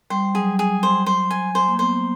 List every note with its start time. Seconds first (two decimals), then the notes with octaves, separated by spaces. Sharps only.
0.10 G3 C5
0.35 F#3 G#4
0.59 G#4
0.83 C5
1.06 F#3 C5
1.31 G#5
1.55 C5
1.68 A#3
1.79 B3 C5